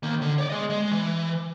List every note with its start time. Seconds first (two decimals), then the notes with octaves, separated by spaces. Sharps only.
0.03 D#3 A#3
0.22 D3
0.38 C#5 D5
0.50 G#4 D#5
0.70 G#3
0.91 E3